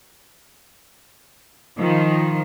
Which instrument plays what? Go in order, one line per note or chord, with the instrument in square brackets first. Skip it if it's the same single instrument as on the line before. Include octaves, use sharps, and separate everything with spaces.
[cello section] D#3 F3